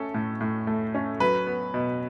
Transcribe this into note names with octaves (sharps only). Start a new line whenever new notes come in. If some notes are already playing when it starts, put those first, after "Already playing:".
Already playing: A3 C#4 A4
A2
A2
A3
C#4
F#3 B4
B3
B2